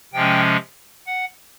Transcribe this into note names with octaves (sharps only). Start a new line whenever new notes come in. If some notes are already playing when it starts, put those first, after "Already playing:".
C3 F3 G#3 C#4 G5
F#5